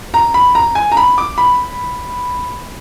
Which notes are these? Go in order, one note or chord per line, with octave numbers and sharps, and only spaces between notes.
A#5
B5
A#5
G#5
A#5
B5
D6
B5